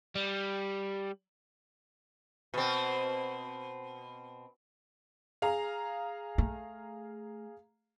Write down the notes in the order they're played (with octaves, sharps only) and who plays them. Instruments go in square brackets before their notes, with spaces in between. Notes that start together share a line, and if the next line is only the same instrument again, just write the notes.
[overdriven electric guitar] G3
[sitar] B2 C4
[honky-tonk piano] G#4 F5 A#5
[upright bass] A3